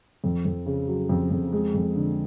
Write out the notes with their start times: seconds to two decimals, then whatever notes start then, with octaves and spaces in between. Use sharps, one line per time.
0.24 F2
0.45 F2
0.66 C#3
0.87 F#3
1.09 F2
1.31 F2
1.52 G#3
1.74 F2
1.96 D3